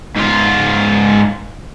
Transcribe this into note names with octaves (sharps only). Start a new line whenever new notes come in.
G#2 F4